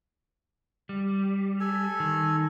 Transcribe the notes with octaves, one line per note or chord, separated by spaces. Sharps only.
G3
A4 G#5
D#3